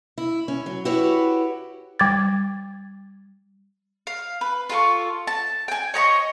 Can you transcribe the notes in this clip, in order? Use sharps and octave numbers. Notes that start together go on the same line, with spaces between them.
E4
C#4
F#3
E4 F#4 G4 B4 C#5
G3 D6 G#6 A6
F5
B4
F4 A4 A5 C#6
A5
G5 G#5
C#5 D#5 A#5 C#6